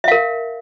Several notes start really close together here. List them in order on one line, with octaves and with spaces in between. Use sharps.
E5 F5 A#4